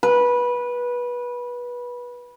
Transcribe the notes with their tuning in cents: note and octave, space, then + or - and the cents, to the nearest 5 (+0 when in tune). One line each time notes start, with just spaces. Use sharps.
B4 -20